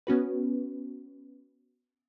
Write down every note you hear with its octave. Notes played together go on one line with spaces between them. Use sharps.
B3 C#4 F#4 B4